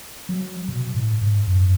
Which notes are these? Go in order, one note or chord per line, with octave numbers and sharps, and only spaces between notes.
F#3
B2
A2
G#2
F#2